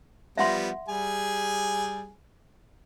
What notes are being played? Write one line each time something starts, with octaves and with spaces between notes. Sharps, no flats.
F3 G3 B3 E5 F#5 C6
G3 G#4 G#5